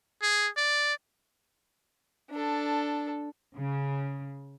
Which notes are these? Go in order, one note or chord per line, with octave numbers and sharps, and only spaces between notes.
G#4
D5
D4 A4
C#3